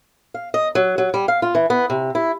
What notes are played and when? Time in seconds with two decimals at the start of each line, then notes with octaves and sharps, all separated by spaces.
0.34 F5
0.54 D#5
0.75 F#3
0.98 F#3
1.14 G3
1.28 F5
1.42 F4
1.55 E3
1.70 B3
1.90 C3
2.15 E4